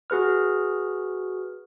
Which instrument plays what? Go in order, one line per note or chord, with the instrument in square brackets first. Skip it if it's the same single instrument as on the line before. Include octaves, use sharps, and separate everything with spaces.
[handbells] F#4 G#4 B4 F6